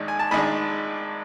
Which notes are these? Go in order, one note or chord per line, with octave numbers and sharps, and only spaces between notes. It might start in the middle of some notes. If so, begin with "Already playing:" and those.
Already playing: G#1 G#2 G#3 D4
G#5
A5
G#1 G#2 G#3 D4 G#5 B5